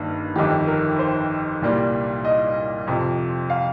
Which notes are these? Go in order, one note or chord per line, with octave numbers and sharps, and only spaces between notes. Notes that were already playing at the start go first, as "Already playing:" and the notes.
Already playing: G1 G2 D#3 A#3
G1 F2 D#3 G4
A#4
C5
C2 A#2 G3 A#3
D#5
F2 C3 F3
F5